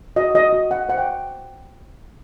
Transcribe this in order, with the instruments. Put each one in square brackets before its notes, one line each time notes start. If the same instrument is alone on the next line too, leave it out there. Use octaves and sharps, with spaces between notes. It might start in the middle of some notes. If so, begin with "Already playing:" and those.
[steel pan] F#4 D#5
F#4 D#5
F#4
F#4 F#5
C5 F#5
G5